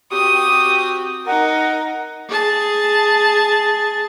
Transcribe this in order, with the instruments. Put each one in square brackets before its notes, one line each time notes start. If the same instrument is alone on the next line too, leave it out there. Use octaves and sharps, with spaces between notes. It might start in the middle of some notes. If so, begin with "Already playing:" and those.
[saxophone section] C4 F#4 G4 [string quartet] D#6
[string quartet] D#4 A#4 [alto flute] F#5
[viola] G#4 A5